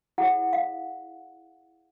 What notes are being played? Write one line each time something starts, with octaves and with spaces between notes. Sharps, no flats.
E4 G#4 C#5 F#5
F5